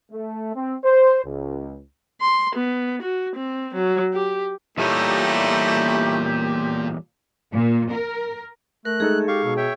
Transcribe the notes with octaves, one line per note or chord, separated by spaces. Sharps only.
A3
C4
C5
C#2
C6
B3
F#4
C4
F#3
G4
E2 A#2 G3 A3 D#4 E4 G4 C#5
A#2
A#4
A3 A#4 F#6
G#3 D#4 G#4 A4
G4 F5 C#6
B2
C#5 E5 G5